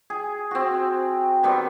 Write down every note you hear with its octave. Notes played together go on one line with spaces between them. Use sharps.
G#4
C4 F#4
D#3 G3 B3 C4